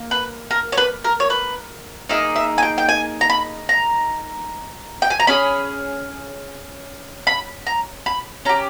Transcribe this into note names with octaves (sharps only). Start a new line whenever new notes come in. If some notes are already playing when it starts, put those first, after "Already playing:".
Already playing: A#3
B4
A#4
C#5
B4
A#4
C#5
B4
A#3 D#4 G#4 E5
E5
G#5
G5
G5
G#5
A#5
B5
A#5
G5
G#5
A#5
C#4 G#4 B5
B5
A#5
B5
C#4 G4 A#5